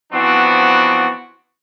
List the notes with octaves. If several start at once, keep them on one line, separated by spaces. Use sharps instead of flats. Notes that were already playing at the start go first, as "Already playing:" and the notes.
E3 F3 B3 C4 D4 F#4